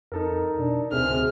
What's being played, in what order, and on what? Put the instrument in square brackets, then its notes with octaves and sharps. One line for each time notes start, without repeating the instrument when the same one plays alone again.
[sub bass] F2 [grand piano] D#4 A4 A#4
[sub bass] B2 [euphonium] D4
[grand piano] D1 C3 C5 [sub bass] D2 [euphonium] G#4 [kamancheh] F6